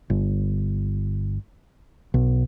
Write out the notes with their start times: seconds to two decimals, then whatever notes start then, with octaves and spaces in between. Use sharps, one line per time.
0.10 G1
2.14 B1